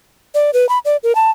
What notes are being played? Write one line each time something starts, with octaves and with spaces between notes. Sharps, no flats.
D5
B4
B5
D5
A#4
A5